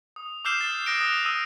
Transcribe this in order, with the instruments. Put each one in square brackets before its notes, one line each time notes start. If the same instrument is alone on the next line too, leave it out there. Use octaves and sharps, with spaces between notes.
[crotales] D#6
D6 E6 F6 G6 C7 E7
A6
D#6 F#6 A#6 C7 D7
D#6
D#6 E6 D#7